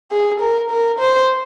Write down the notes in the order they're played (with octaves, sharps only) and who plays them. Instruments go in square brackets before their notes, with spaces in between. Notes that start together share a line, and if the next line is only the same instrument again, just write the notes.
[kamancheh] G#4
A#4
A#4
C5